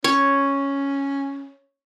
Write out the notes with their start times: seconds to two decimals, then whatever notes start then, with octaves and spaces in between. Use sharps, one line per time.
0.04 C#4 C#5